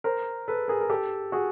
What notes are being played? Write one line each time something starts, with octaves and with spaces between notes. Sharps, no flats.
A#4 C5
A4 B4
G#4 A#4
A#4
G4 A4
F#4 G#4